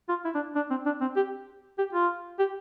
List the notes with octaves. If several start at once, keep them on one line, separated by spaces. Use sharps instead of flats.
F4
E4
D4
D4
C4
D4
C4
G4
G4
F4
G4